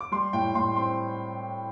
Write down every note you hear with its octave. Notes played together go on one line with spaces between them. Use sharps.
D6
G3 C6
A2 G5
A2 C6
C4 C6